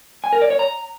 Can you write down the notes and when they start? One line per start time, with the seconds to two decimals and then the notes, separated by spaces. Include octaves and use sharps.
0.24 G#5
0.33 A#4
0.41 D5
0.50 C#5
0.59 A#5